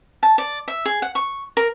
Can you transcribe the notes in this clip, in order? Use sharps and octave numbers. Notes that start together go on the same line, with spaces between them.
A5
D5
E5
G#4
F#5
C#6
A#4